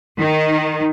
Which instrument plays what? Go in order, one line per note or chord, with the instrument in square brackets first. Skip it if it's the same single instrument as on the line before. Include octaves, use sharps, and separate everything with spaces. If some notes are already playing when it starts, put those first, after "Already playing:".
[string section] D#3